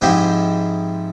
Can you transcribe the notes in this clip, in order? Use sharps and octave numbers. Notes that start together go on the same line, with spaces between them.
G#2 F3 G#3 C4 E4 G4